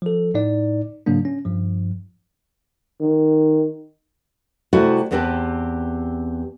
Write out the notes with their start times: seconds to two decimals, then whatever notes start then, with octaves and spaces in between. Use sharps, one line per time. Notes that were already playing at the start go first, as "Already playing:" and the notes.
0.02 F3 A4
0.34 A2 D#4 D5
1.06 G#2 C#3 F#3 A#3 D4
1.25 C#4
1.45 G2 F3
3.01 D#3
4.73 C3 G3 A3 E4 F#4 B4
5.11 E2 B3 C4 G4 B4 A5